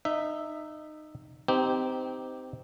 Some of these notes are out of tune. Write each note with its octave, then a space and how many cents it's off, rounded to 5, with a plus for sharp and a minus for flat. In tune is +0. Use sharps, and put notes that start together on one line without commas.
D#4 -20 E5 +0
C4 -20 D#4 +0 G4 +0